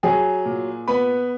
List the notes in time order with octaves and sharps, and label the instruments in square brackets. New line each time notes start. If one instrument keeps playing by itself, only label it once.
[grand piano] F#3 G#4 G#5
A#2
B3 B4 B5